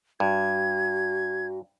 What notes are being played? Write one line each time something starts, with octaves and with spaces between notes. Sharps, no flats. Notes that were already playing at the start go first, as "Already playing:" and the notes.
G2 F#4 G#6